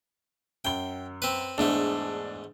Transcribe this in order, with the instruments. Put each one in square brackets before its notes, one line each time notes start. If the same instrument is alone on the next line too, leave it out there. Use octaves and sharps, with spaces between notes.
[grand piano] F#2 G7 [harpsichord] G5
[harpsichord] C4 B4
[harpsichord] E2 G#2 A3 [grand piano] D4